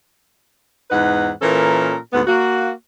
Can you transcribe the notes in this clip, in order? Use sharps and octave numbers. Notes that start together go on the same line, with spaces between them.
E2 G#2 D#4 B4 F#5
A#2 E3 C#4 A4 A#4
D2 G#2 B3
A#3 F#4